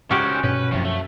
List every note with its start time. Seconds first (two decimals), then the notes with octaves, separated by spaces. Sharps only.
0.11 C#2 C#4 F#4 G4 C5
0.43 G2 B2 C#4 B4
0.71 F#2 A2 C3 F3 F#3
0.85 A3